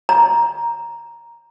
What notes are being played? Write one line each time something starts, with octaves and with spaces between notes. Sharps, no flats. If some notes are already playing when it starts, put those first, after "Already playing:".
A#5